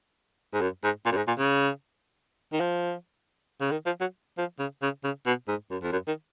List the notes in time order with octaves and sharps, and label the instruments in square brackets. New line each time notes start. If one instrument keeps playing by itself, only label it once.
[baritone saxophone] G#2
F#2
G#2
A#2
F#2
G#2
A#2
C#3
D#3
F3
C#3
D#3
F3
F#3
F3
C#3
C#3
C#3
B2
G#2
F#2
F2
F#2
D#3